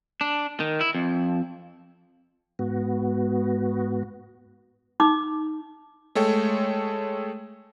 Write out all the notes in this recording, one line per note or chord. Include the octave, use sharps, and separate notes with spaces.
D4
D#3
E4
F2
G#2 B3 F#4
D#4 D6
G#3 A3 A4 C#5 G5